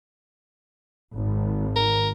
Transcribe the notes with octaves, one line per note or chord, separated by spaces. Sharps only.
G#1
A#4